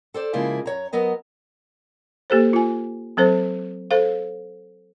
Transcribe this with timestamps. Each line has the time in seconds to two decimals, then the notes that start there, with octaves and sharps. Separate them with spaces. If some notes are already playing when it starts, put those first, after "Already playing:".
0.14 A4 C5 D5
0.33 C#3 F3 G#3 A#3 E4 F4
0.66 F#2 C#5 A#5
0.93 F#3 B3 A#4 D#5
2.30 A#3 G4 A4 C5
2.53 F4 G#5
3.17 F#3 C4 A4 C5
3.91 A4 C5 F5